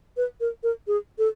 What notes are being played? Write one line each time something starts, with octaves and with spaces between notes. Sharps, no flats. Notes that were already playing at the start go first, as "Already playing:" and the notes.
B4
A#4
A#4
G#4
A4